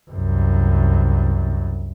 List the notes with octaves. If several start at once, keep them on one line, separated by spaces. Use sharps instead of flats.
C2 F#2